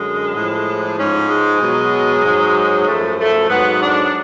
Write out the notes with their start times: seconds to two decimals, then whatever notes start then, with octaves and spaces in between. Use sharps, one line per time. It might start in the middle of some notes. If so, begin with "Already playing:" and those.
Already playing: F#2 D3 F#3 G#3
0.34 A2 F3
0.97 G#2 F3 C#4
1.29 G#3
1.60 B2 F#3
2.23 G#2 F#3
2.86 F#2 F3 A3
3.18 A3
3.48 G#2 F#3 B3
3.81 D4